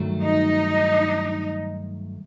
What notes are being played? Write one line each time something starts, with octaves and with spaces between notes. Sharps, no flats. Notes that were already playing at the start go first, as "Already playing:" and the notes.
Already playing: G2 D#3 F#3 A3
D#4